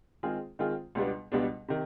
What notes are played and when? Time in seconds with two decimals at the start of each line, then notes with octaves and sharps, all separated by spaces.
0.23 D#3 G#3 C4 F4 G#4
0.59 D#3 G#3 C4 F4 G#4
0.95 C#2 B2 G3 B3 D4
1.32 C#2 B2 G3 B3 D4
1.69 C3 D#3